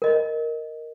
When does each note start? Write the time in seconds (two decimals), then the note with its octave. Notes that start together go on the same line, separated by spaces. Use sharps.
0.02 A#4 D#5